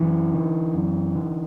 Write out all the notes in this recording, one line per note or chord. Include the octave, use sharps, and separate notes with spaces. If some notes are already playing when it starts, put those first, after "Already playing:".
Already playing: F#2 E3
D3
F#2
D3